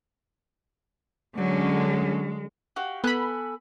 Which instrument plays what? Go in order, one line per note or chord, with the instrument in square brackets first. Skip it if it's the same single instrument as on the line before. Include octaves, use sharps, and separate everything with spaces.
[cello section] D3 C#4 [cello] F#3 [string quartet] G#3
[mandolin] F#4 G4 F5
[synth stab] B3 B5 [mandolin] A4 G#5 F#6